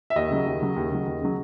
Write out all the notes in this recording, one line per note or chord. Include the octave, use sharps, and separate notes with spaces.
E5
D#2 D#5
C#3 F#3
D#2
C#3 F#3
D#2
C#3 F#3
D#2
C#3 F#3